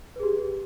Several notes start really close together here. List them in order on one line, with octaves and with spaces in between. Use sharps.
B4 G#4 G4